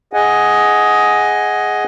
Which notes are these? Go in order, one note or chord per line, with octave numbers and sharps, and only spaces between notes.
G#4 D#5 F#5 G#5